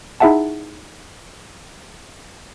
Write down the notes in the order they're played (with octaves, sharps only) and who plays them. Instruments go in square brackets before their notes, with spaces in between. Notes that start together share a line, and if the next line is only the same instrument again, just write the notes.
[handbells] D#4 E4 G#4 E5 F#5 A5